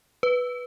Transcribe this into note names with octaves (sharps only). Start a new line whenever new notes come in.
B4